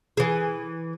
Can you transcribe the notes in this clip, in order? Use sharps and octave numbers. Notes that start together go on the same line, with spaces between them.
E3 G#4